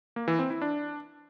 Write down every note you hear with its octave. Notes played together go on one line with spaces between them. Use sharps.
A#3
E3
C4
E4
D4